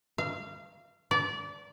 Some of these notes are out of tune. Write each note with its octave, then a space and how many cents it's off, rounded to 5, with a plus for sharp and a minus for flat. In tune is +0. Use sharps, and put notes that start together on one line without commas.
F5 -25
D5 -25